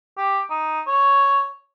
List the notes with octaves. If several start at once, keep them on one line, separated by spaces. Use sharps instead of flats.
G4
D#4
C#5